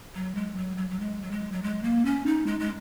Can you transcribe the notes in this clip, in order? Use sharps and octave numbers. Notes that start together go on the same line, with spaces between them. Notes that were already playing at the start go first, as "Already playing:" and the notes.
F#3
G#3
F#3
F#3
F#3
G#3
F#3
G#3
F#3
G#3
A#3
C#4
D#4
G#3
G#3